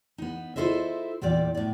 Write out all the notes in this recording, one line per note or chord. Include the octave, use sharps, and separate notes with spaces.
B3 D#4
E4 F4 A4 C5 D#5 E5
E2 A#2 G3 G4 D5
A2 D5